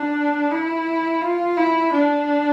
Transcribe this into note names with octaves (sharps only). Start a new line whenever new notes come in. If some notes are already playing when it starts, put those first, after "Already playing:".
Already playing: D4
E4
F4
E4
D4